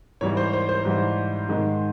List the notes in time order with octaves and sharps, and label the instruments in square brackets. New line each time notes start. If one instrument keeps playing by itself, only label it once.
[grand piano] G#2 E3 G3 C#5
C5
C5
C5
G#2 E3 G3
G#2 D#3 G#3